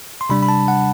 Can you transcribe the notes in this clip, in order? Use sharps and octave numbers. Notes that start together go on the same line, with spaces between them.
C6
C3 G3 D4 B5
B5
A5
F#5